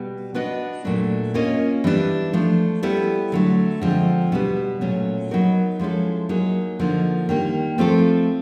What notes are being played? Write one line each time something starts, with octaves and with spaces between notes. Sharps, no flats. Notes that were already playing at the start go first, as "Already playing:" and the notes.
Already playing: B2 G3 B3
B3 D4 F#4 B4 D#5
A#2 F#3 A3 D4
A#3 C#4 F4 A#4 D#5
E3 G3 B3 D4
F3 A3 D4
G3 B3 E4 A4
D3 F#3 A3
D3 F3 G#3 C4
B2 G3 B3
A#2 F#3 A3 C#4
F#3 B3 D#4 F#4 A#4
F3 G#3 C#4 E4 A4
F#3 A#3 D#4 G#4
D3 F3 A#3 D#4
D#3 G3 A#3
F3 A3 C4 F4 A4